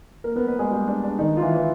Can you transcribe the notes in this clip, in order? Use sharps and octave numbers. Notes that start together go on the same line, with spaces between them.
A#3 A#4
B3 B4
B3 B4
G#3 G#4
G3 G4
D4
D4
D#3 D#4
F4
E3 E4
E3 E4